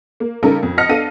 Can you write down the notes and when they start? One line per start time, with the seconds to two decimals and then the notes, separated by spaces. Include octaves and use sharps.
0.20 A#3
0.43 C#3 G3 C#4 D#4 A4 A#4
0.63 F2
0.78 D#5 F#5 A5 F6 A#6 C#7
0.89 B3 D4 A4 F5 A#6 D#7